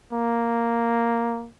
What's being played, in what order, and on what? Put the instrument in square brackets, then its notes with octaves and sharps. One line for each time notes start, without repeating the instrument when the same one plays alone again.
[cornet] A#3